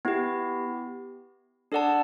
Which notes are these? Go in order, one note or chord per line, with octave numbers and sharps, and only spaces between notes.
B3 E4 G4
D4 A4 D5 F#5 A5